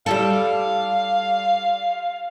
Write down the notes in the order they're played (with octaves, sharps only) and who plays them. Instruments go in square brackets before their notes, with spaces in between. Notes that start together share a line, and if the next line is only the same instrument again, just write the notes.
[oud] G3 E4 A4 [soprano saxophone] F5